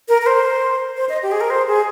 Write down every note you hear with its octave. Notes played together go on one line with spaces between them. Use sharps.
A#4
A#4
C5
C5
D#5
G4
G#4
A#4
C5
G#4